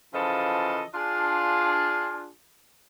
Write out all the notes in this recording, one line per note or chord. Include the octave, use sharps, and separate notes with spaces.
C#3 E3 F3 F4 A4 D#5
D4 F4 G#4